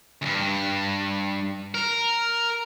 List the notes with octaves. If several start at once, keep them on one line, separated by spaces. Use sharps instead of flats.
D2 G2
A#4